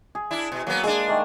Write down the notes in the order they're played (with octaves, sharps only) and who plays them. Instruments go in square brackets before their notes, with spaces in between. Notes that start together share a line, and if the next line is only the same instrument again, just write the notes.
[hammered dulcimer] G#4
[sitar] D4 E4
B2
[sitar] F#3 B3 [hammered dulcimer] A#3
[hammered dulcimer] G#3 [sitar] D4 G#4
[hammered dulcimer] D#3 A3 A#3